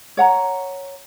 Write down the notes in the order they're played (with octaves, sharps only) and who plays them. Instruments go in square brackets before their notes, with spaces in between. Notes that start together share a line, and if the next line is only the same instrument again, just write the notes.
[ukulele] C#5 F#5 A#5